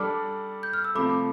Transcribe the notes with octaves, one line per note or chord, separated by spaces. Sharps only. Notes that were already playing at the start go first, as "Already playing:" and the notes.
Already playing: G3 D4 A4 D6 F6
G6
F6
E6
C3 F3 A3 B5 D6